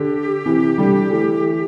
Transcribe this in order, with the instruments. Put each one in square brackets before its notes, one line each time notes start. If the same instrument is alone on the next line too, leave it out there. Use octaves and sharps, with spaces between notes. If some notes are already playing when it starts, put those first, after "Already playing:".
Already playing: [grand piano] D3 [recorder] G4
[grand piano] C3 E3
D3 G3
E3 A3